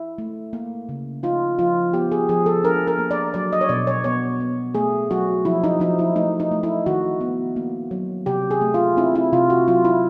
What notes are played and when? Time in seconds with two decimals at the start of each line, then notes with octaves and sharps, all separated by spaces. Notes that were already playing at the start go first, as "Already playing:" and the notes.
Already playing: E4
0.18 A3
0.53 A#3
0.89 C#3
1.23 D#4 F4
1.59 F3 F4
1.93 B3 G4
2.12 G#4
2.29 F3 G#4
2.46 A4
2.63 D4 A#4
2.87 A#4
2.99 A#3
3.11 D5
3.34 F#3 D5
3.53 D#5
3.61 C#5
3.69 B2 D5
3.87 C#5
4.04 B3 C#5
4.40 B3
4.75 A3 G#4
5.10 F#3 F#4
5.45 F3 E4
5.64 D#4
5.80 F3 D#4
5.99 E4
6.16 A3 D#4
6.40 D#4
6.51 A3
6.63 E4
6.86 D#3 F#4
7.21 B3
7.56 A#3
7.91 F#3
8.26 C3 G4
8.51 G#4
8.61 A3
8.74 F4
8.97 C4 E4
9.15 E4
9.33 C3 F4
9.50 F#4
9.68 F#3 F4
9.85 E4